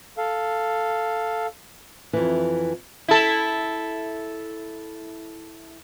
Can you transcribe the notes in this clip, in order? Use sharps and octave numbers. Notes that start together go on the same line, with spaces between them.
A4 F5
F2 E3
E4 A4